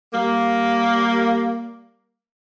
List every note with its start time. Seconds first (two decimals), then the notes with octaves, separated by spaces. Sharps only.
0.14 G3 A#3